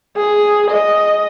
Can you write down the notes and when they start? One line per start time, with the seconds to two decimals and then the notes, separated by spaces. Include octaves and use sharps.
0.17 G#4
0.71 D#5